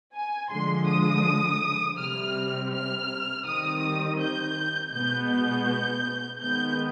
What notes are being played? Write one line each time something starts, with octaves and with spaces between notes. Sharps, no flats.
G#5
D3 F3 G#3 C6
D#6
C3 G3 C4 F6
F6
D#3 G3 C4 D#6
G6
B2 G#3 B3 G6
G6
D#3 G#3 B3 G6